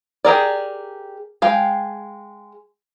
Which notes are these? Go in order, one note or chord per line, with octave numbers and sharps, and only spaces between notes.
G4 G#4 A#4 D5
G#3 F5 G5